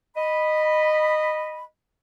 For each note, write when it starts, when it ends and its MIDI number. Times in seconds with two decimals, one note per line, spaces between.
0.17 1.65 75
0.17 1.65 83